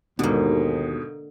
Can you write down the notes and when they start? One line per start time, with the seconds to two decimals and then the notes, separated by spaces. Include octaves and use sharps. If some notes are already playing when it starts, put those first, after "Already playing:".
0.19 D#2 G#2 B2 D3 A#3